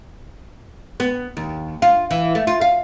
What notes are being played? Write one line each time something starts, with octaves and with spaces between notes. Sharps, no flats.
B3
D#2
F4
E3
A3
F4
F5